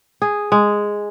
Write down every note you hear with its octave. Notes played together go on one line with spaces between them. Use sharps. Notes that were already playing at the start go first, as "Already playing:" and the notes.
G#4
G#3